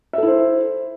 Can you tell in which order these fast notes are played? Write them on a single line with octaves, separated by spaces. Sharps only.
E5 A4 E4 C5